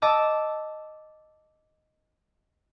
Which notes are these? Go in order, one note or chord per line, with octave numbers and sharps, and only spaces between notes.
D#5 A5 D6 E6